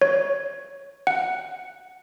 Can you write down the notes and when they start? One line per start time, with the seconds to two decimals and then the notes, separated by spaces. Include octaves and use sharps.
0.02 C#5
1.07 F#5